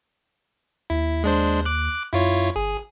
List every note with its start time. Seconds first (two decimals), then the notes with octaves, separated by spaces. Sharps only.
0.90 D#2 E4
1.24 G#3 D4 C5
1.65 D6 F#6
2.13 F#2 E4 F4 C#5
2.56 G1 G#4